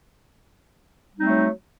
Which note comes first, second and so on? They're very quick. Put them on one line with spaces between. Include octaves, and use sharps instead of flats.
G3 D#4 C4 A3 F#3